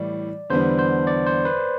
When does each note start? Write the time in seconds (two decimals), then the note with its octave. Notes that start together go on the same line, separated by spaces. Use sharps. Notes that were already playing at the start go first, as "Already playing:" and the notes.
Already playing: A2 E3 G3 D5
0.50 E2 D3 G3 B3 D4 C5
0.79 C5
1.07 D5
1.26 C5
1.45 B4